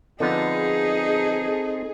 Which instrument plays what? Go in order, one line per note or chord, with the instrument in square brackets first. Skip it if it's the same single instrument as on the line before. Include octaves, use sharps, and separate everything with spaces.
[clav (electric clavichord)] D3 F3 B3 [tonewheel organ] C4 A4 [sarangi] D#4 [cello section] G#4